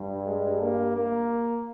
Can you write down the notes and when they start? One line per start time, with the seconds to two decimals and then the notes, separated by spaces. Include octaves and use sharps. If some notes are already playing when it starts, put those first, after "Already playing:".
Already playing: G2
0.26 G#3
0.60 A#3
0.96 A#3